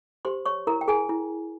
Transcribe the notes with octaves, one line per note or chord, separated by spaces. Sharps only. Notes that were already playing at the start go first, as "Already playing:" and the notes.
G4 C5 C6
C#5 C#6
E4 A#4 A#5
G5
G#4 G#5
E4